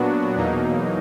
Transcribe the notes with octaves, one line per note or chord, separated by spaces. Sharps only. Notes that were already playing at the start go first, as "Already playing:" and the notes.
Already playing: A#2 F#3 B3 D4 F#4
E2 B2 F#3 A#3 D#4